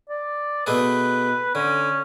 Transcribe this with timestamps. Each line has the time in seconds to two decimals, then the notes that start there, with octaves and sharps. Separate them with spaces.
0.09 D5
0.67 B2 A3 G#4 B4
1.55 D3 C#4